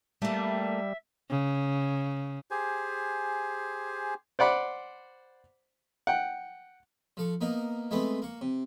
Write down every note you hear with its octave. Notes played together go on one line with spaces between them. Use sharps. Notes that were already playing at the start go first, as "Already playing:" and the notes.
G3 A3 A#3 E5
C#3
G4 G#4 C5 G#5
C5 D5 F#5 B5 D6
F#5 G5
F3 A4 C#6
A#3 B3 D#4 A#4
G#3 A3 B3 C4 B4
A#3 C#6
C3